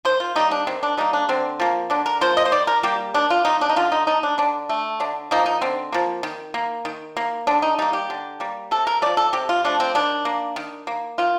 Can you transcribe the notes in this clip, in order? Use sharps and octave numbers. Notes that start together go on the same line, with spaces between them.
D#3 C5
F4
G3 A#3 D#4
D4
D#3 C4
D4
G3 A#3 D#4
D4
D3 C4
F3 A#3
D3 D4
A#4
F3 A#3 C5
D#5
C5
D#3 D5
A#4
G3 A#3 G4
D#3 D4
F4
G3 A#3 D#4
D4
D#4
D3 F4
D#4
A3 D#4
D4
D3 D4
A3
D3 D4
F3 A#3 D#4
D#4
D3 C4
F3 A#3
D#3
A#3
D#3
A#3
D3 D4
D#4
G3 A#3 D#4
G4
D3
G3 A#3
C3 A4
A#4
F3 A3 D5
A4
C3 G4
F4
F3 A3 D4
C4
D#3 D4
A#3
D#3
A#3
D#3 F4